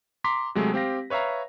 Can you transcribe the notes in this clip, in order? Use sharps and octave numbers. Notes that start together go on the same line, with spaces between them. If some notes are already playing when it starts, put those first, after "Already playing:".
A#5 C6 D6 B6
C3 F#3 G#3 A3
C4 G4 F5 A#6
B4 C#5 E5 F5 A#5